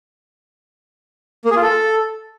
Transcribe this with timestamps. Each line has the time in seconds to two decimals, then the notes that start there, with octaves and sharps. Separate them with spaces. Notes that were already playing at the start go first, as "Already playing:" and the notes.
1.45 A#3
1.51 G#4
1.57 F4
1.62 A4